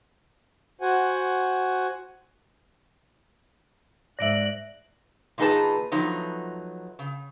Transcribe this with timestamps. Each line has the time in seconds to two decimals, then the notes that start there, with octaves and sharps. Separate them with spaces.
0.81 F#4 C5 F#5 G#5
4.19 G#2 D5 E5 F#6 A#6 D7 F#7
5.38 A#2 E3 D#4 G#4 B4 A5
5.92 F3 F#3 A3 B3 D#4
6.99 C#3